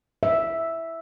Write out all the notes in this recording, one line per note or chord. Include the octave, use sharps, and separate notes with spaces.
E5